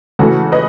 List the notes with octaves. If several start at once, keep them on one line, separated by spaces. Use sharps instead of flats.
C#3 E3 A3 F#4 A4
B4 D#5